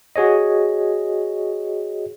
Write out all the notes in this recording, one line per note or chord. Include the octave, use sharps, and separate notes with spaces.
F#4 G#4 C#5 D#5